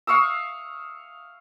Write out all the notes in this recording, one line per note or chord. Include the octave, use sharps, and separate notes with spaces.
F5 C#6 D#6 E6